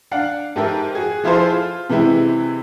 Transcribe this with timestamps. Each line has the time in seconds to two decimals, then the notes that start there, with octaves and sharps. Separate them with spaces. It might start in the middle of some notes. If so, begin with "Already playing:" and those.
0.11 D4 F5 F#5
0.56 G#2 G4 A4 A#4 E5
0.95 F#4 G#4
1.24 F3 E4 F4 G#4 A4 C5
1.53 F4
1.89 C3 E3 G#3 E4 G4